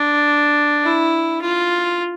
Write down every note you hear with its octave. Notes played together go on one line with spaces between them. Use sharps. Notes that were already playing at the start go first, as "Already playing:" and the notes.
Already playing: D4
E4
F4